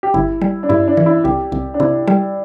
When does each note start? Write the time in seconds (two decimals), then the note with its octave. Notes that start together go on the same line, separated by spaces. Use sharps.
0.03 G4
0.14 G1 E4
0.41 G3
0.63 D4
0.69 G2 E4
0.88 D4
0.97 E3
1.06 E4
1.24 C2 G4
1.52 C2
1.74 D4
1.80 C3 E4
2.07 G3